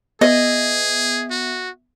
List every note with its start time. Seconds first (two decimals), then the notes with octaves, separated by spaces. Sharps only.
0.21 B3 G#4 D#5 E5
1.31 F#4